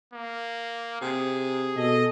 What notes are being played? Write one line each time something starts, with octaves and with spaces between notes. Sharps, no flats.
A#3
C3 G#4
B2 A4 D#5